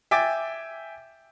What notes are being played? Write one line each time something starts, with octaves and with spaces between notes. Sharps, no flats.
E5 G5 G#5 D6 A6